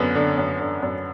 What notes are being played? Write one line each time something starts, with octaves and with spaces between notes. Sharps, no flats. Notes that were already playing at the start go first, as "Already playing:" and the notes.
Already playing: F#2 D3 B3
D3
F#2
D3
F#2